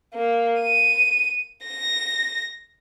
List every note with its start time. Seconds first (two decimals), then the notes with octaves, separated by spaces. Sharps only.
0.14 A#3
0.61 D#7
1.66 A#6